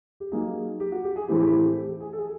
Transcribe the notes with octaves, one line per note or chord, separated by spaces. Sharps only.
G4
F#3 A#3 D#4 G#4
G4
F#4
G4
G#4
A2 E3 A3 C4 E4 G4
G4
G4
G4
G4
G4
G#4
A4
G#4